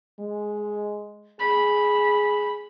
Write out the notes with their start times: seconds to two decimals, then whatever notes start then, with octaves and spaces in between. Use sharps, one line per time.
0.19 G#3
1.40 G#4 B5